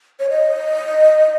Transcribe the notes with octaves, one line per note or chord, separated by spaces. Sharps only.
C#5
D#5